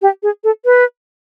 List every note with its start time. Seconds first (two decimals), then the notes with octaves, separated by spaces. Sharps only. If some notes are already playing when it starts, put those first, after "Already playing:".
0.02 G4
0.23 G#4
0.44 A4
0.65 B4